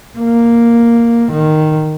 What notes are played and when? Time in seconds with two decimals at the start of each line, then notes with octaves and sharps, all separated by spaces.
0.18 A#3
1.31 D#3